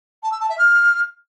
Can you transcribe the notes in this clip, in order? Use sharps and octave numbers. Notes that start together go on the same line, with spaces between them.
A5
E6
A5
E5
F6